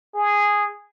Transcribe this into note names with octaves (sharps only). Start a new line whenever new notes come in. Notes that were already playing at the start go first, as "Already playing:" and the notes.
G#4